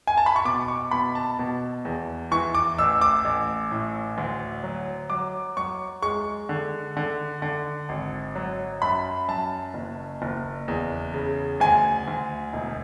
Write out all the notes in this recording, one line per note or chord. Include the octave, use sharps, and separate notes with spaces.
G#5
A5
B5
C#6
B2 D6
C#6
B2 B5
A5
B2
E2
E3 C#6
D6
A1 E6
D6
A1
A2
D2
F#3
F#3 D6
F#3 C#6
G#3 C#6
D3
D3
D3
G#1
F#3
F#2 B5
F#2 A5
F#1
F#1
E2
C#3
D2 G#5
D2
E1